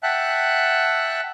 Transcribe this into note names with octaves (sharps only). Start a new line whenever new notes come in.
E5 F#5 G5 A5 F#6